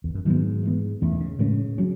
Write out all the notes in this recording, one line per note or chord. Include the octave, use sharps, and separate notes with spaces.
E2
F#2
G#2 D#3 F#3 B3
E3 G#3 B3
E2 C#3 E3 A3 C#4
D#3
C#3
A2 C#3 G#3 C#4
F#3 C#4